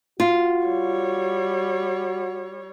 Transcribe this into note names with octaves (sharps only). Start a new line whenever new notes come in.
F4 F#4
G3 C#5